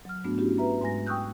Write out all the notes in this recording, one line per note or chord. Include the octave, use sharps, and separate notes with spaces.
F#3 F6
G#2 A3 B3 D4 F#4
C#4 D4 E4 F#4 G4
B4 E5 A#5
G#2 G#3 G#5 A#6
G5 C#6 D#6 E6 F#6 G6